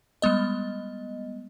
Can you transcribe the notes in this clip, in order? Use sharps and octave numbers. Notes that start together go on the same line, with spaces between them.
G3 G#3 B3 D#5